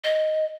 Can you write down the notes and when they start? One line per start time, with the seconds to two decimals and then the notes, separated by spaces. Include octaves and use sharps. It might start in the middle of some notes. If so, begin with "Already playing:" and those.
0.04 D#5